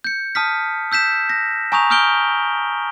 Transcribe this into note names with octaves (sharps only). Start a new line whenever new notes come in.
G6 C#7
A5 D#6 F6 B6
E6 G6 B6 E7
A#6
G#5 A#5 C#6 D#6 G6 F7
D#6 F6 G6 D7 G7